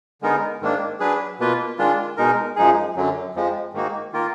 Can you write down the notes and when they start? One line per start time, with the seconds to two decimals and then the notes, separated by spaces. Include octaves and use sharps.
0.22 D3 G#3 B3 D#4 A#4
0.62 G#2 D#3 A#3 D4
1.00 F#3 D4 G#4 B4
1.39 B2 A#3 F4 B4
1.78 D#3 G#3 D4 F4
2.17 B2 G#3 D#4 A#4
2.56 F#2 F3 G#3 D#4 G#4
2.96 F#2 D3 F#3
3.35 F2 F3 G#3
3.73 G#2 D#3 A#3 D#4 F#4
4.12 D#3 A#3 F4 A#4